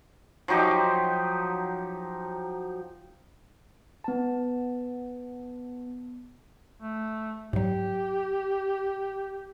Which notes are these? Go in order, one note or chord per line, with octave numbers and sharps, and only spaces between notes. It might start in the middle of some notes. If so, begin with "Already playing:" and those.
F3 F#3 D#4 G4
B3 A5
A3
G#2 F#3 G4